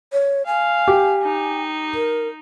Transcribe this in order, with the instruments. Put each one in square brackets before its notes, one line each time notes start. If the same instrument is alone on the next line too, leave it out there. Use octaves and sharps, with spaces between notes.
[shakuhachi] C#5
[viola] F5 [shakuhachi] G#5
[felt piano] G4
[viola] D#4
[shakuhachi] A#4